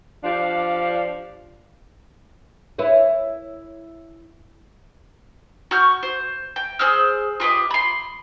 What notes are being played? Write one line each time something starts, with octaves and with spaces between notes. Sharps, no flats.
F3 D4 G4 D5 F5
E4 B4 C#5
F#4 C#6 F6 G6
C5
G5
G#4 C5 E6 F6
F4 G4 B4 D#5
B5 C6